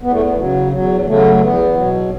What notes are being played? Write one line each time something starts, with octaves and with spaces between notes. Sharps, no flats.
E2 B3
A3
B3
C#3 F#3
E2 F#3
C#3 F#3 A3
A3
E2 B3
B2 F#3